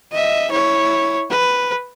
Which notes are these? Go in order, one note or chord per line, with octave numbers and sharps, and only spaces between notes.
D#5 E5
E4 C#5
B4